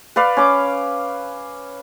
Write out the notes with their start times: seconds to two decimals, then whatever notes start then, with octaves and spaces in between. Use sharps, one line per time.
0.16 B4 D5 F5
0.37 C#4 D6